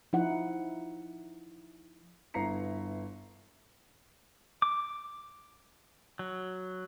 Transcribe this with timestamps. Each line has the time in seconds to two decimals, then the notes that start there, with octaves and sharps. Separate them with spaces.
0.13 F3 D#4 E4 F#5
2.34 G1 B3 E4 A#5 C7 C#7
4.62 D6
6.19 F#3